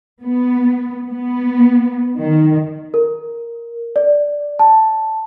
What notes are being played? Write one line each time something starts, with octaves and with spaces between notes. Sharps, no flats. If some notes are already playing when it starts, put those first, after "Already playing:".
B3
B3
D#3
A#4
D5
A5